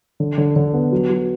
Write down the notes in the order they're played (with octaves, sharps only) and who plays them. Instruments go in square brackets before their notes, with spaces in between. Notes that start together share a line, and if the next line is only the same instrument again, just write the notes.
[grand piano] D3
D3
D3
B3
F#3
F#3